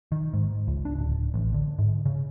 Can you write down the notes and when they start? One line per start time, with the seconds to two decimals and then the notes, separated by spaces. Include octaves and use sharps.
0.12 D#3
0.33 G#2
0.67 C#2
0.85 D4
0.98 D1
1.34 A1
1.54 D3
1.79 G#2
2.06 C#3